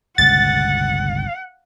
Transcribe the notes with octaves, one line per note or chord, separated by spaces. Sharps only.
G1 C#2 B2 F#5 A6